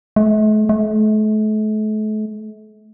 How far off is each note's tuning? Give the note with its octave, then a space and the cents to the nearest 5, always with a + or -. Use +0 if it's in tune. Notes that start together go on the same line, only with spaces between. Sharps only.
A3 -45
A3 -40